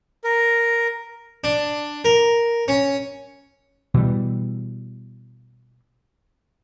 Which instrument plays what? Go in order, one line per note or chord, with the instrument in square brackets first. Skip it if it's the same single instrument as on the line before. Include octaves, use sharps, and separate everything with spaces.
[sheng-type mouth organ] A#4
[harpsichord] D4
A#4
C#4
[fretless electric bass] B2 E3 G3